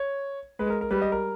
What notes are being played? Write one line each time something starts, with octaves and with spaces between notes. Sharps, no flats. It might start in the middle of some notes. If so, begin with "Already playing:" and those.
Already playing: C#5
G#3 B4
A#4
A#4
G3 B4
D#5
A#4